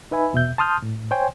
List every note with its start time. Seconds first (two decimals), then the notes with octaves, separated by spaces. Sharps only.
0.11 D#4 B4 E5 G#5 B5
0.33 E2 B2 E5 G6
0.58 A5 C6 D#6 F6 G6
0.82 A2
1.11 C5 C#5 G5 G#5 C6